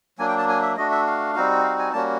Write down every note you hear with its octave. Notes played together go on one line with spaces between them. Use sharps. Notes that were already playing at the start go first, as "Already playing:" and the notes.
F#3 A#3 D4 G#5
G5
A5
G#5
E5
A3 D4 F#4 D#5
E5
F5
G3 C4 D#4 F#4
F5
G#5
G3 A#3 C#4 F#4 A5